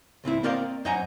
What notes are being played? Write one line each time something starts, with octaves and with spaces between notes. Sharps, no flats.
C#2 A2 C4 E4
A#3 C4 A#4 D5 D#5 F5
F#2 C5 D#5 F#5 G#5 A#5